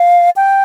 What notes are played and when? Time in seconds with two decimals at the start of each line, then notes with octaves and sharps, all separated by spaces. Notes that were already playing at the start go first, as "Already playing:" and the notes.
Already playing: F5
0.36 G5